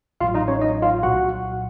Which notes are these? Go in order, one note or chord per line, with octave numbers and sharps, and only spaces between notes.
A1 A2 F#3 F4 F5
D#4 D#5
C#4 C#5
D#4 D#5
F4 F5
C2 A#2 F#3 F#4 F#5